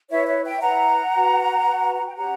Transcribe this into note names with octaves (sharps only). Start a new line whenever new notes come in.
E4 B4 C#5 E5
C#5 E5
E5 G5
E4 B4 F#5 A#5
F#4 B4
F#4 B4
F#5
G5
C#4 G4 C#5 F#5 A#5